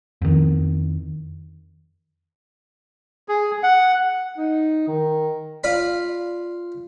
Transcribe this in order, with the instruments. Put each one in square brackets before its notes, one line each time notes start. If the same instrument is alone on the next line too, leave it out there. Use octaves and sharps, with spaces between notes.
[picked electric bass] F2 D#3
[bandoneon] G#4
F#5
[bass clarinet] D#4
D#3
[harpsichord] F4 D5 B5